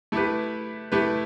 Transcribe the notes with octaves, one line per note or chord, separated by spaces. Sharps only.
A3 E4 G4 B4
A3 E4 G4 B4